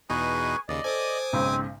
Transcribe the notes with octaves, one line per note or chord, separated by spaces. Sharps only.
E2 B2 D#4 G#4 B4 G#5 C#6
D#2 C#3 D5 D#5
A4 C5 G#5 D6 D#6
B1 G#2 C#3 C4